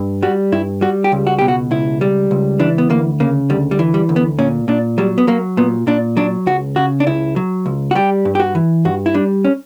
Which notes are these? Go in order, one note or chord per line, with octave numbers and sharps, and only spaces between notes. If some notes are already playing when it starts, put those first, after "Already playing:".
Already playing: G2
G3 F#4
G2 E4
G3 F#4
G4
C#2
F#4
B2 G4
F#4
C#2 E4
G3
C#2
E3 D4
B3
D2 A#3
C#3 A#3
D2 G3
G3
E3
G3
D2
B3
A#2 C#4
A#2 D4
F#3 G3
B3
F#3 A#3
A#2 B3
A#2 D4
F#3 D4
C#2 F#4
C#3 F#4
D4
C#2 E4
F#3
C#2
F#4
G3 G4
G2
G4
F#4
E3
G2 F#4
E4
G3 D4
C#4